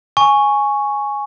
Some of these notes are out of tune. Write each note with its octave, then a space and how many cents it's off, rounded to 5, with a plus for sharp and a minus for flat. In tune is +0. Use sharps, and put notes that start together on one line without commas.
G#5 +0 C#6 +0